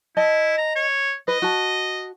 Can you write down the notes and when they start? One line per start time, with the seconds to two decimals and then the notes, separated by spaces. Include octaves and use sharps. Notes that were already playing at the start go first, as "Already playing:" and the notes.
0.17 E4 D#5 A5
0.58 A#5
0.75 C#5
1.28 B4 D#5
1.42 F#4 A5